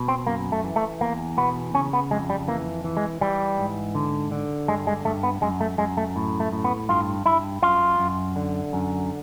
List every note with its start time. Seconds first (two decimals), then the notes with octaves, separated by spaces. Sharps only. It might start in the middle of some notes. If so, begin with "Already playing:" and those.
Already playing: B2
0.08 C4
0.27 F#2 A#3
0.52 A3
0.64 E3
0.76 A3
1.01 E2 A#3
1.37 B2 B3
1.74 C#3 C#4
1.93 B3
2.11 F2 G#3
2.30 G3
2.48 E3 A#3
2.84 E3
2.97 G#3
3.21 E3 G3
3.58 G#2
3.95 D3
4.31 D3
4.68 G2 G#3
4.87 G#3
5.05 G2 A3
5.23 B3
5.42 F#2 G#3
5.61 A3
5.78 F#2 G#3
5.97 A3
6.16 A2
6.40 A3
6.53 A2
6.64 B3
6.89 G2 F4
7.26 G2 E4
7.62 F#2 F4
7.99 F#2
8.36 D3
8.73 F#2